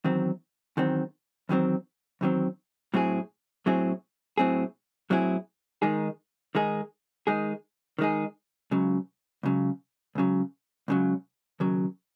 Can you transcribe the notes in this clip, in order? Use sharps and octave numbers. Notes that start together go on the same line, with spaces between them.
E2 D#3 F#3 C4
E2 D#3 F#3 C4
E2 D#3 F#3 C4
E2 D#3 F#3 C4
A2 F#3 C4 E4 G#4
A2 F#3 C4 E4 G#4
A2 F#3 C4 E4 G#4
A2 F#3 C4 E4 G#4
D#3 G#3 D#4 G#4
D#3 G#3 D#4 G#4
D#3 G#3 D#4 G#4
D#3 G#3 D#4 G#4
C#2 C#3 F#3
C#2 C#3 F#3
C#2 C#3 F#3
C#2 C#3 F#3
D#2 C#3 F#3